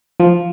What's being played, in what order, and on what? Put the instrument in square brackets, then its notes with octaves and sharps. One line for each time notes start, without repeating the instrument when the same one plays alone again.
[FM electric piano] F3